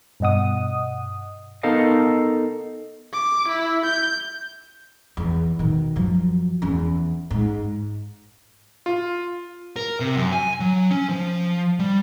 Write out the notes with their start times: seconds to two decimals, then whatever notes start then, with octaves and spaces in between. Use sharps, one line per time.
0.20 G2 B2 D#5 F#5 D#6
1.63 B3 D#4 A4 A#4 D#5 F5
3.13 D6
3.48 E4
3.85 G6
5.17 E2
5.59 B2 D#3
5.96 F#2 F3
6.62 E2 C#4
7.30 G#2
8.86 F4
9.76 A#4
10.00 C3
10.16 F#2
10.32 G#5
10.60 F#3
10.91 C#4
11.09 F3
11.79 G3